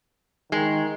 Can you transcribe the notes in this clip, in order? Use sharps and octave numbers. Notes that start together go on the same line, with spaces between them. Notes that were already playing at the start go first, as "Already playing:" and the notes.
D#3 G#3